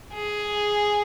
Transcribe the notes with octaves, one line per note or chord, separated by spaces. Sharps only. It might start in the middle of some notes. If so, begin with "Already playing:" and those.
G#4